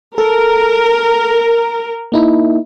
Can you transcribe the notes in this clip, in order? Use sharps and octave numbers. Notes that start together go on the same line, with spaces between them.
A4 A#4
A#3 D#4 E4